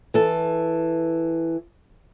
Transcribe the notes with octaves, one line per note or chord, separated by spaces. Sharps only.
E3 A4